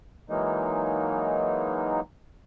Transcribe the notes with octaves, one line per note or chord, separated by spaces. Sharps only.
E3 F#3 G#3 A#3 D#4